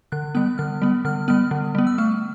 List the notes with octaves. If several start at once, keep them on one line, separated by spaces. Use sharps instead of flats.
D3 F#6
G3 B3 F#6
D3 F6
G3 B3
D3 F6
G3 B3 F6
D3
G3 B3
E6
A3 F6